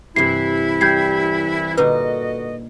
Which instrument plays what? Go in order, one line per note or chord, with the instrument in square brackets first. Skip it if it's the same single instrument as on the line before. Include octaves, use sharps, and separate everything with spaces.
[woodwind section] C2 E3 E4 [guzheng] G2 C3 [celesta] C7
[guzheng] G3 [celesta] G6 G#6 C7
[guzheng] A#2 D3 D#4 [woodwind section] F#4 A4 D#5 [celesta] B4